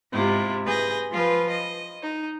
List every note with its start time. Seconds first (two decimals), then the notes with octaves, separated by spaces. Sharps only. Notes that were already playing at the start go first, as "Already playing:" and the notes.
0.12 G#2 C3 E4 F4
0.66 G#4 B4 G6 A#6
1.12 F3 F4 B4
1.50 D#5
2.03 D#4